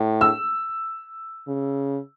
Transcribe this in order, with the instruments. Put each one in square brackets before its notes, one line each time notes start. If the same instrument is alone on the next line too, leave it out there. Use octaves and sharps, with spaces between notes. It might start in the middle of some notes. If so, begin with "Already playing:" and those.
Already playing: [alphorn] A2
[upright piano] E6
[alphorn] C#3